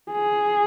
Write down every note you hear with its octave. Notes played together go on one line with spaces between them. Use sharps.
G#4